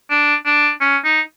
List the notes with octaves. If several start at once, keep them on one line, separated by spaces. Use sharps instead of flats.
D4
D4
C#4
D#4